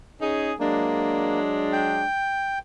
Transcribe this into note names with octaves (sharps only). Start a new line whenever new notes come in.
C#4 D#4 G#4
F#3 G#3 A#3 D4
G5